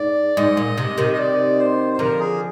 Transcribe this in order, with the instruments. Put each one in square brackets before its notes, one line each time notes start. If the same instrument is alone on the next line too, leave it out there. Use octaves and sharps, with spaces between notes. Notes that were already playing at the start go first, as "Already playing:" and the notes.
Already playing: [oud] G#2 [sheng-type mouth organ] D5
[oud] G#2 [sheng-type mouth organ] D#5
[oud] A#2
C3
C3 D#3
[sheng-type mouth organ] D#5
D5
C5
C5
[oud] D3 F3 [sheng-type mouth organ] A#4
[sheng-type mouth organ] G#4